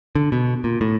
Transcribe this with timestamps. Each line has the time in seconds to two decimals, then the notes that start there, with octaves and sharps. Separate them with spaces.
0.15 D3
0.32 B2
0.64 A#2
0.81 A2